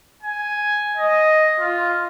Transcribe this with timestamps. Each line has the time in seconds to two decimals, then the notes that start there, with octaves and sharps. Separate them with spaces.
0.23 G#5
0.96 D#5
1.59 F4